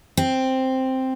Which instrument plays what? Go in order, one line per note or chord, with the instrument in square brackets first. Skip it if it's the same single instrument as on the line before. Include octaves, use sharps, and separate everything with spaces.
[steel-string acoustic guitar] C4